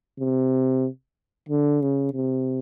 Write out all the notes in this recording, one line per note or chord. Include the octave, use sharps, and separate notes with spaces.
C3
D3
C#3
C3